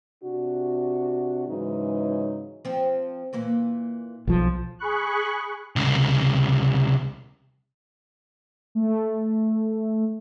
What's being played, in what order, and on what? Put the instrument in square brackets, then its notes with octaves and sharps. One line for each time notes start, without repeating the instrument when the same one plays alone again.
[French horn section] C3 D4 F#4
G#2 C#3 E3 F#3 D#4
[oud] F3 C4
A#2 E3 A#3
[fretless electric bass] B1 F3
[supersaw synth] G#4 B5 C#6 F#6
[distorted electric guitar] C2 C#3
[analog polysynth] A3